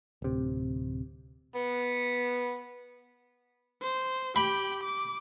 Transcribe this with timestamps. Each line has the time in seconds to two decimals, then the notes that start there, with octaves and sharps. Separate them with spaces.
0.22 D1 C3
1.56 B3
3.82 C5
4.36 G4 G5 B5
4.83 D6